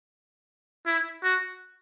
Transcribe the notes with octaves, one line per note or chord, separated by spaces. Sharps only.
E4
F#4